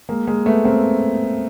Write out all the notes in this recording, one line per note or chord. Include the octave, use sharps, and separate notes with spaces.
G#3 A#3
G#3 A#3
A3 B3
A#3 C4